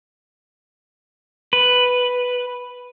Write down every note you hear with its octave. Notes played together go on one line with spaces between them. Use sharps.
B4